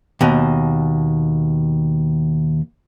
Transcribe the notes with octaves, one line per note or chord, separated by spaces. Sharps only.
D#2 B2